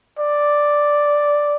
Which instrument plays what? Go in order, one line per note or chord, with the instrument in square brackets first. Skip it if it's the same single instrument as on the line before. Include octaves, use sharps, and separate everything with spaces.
[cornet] D5